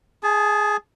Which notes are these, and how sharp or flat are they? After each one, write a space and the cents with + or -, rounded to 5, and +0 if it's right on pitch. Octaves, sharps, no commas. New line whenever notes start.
G#4 +0 A5 -30